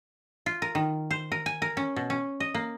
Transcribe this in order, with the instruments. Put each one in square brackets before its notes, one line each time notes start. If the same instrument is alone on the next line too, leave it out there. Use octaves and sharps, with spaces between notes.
[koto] F4
A#4
D#3
C5
A#4
G#5
A#4
C#4
B2
C#4
D#5
A#3